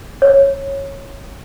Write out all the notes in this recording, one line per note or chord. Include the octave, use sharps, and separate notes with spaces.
C#5